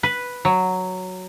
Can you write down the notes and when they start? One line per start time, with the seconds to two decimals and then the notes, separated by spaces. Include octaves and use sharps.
0.03 B4
0.45 F#3